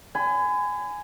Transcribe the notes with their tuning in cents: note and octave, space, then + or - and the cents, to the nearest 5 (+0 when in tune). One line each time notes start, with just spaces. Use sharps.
G#5 +0 B5 +40